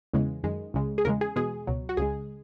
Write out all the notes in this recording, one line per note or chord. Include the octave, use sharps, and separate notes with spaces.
E2 C#3 E3 G#3
F#2 D#3 G#3
C#2 C#3 G#3
G#4
E2 C#3 G#3 A#4
G#4
E2 B2 G#3 G#4
C#2 B2 F#3
F#4
C#2 C#3 G#3 G#4